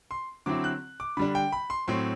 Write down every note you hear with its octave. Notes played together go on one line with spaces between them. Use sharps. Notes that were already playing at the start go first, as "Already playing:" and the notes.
C6
D3 F#3 C4 E4 D6
F#6
D6
D3 G3 D4 B5
G5
B5
C6
A2 F#3 C4 C6